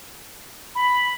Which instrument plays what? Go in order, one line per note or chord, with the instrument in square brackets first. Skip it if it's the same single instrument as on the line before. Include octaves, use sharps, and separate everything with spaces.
[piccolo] B5